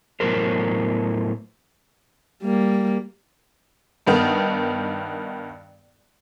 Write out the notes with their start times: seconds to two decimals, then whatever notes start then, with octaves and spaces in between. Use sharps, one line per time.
0.20 A2 F#3 B3 A#4 C5
2.43 G3 A#3
4.07 G2 D#3 B3